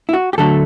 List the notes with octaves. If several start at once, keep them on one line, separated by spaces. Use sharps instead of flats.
E4
F#4
G4
D2 D3 F#3 A3 A4